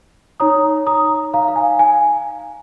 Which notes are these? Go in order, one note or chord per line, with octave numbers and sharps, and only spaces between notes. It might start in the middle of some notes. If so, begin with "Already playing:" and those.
D#4 C#5 A#5 D#6
A#5 D#6
F5 A#5
F5
G#5
G#5